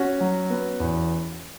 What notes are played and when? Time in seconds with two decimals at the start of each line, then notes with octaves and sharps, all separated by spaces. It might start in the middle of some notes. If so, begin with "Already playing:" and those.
Already playing: C#4 F#4
0.21 F#3
0.50 B3
0.80 E2